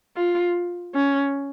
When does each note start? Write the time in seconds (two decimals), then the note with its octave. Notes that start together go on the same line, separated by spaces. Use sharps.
0.17 F4
0.95 C#4